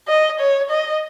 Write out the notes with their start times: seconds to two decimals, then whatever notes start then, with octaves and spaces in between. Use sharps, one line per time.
0.08 D#5
0.39 C#5
0.70 D#5